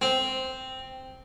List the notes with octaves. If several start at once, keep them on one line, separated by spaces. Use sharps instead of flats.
C4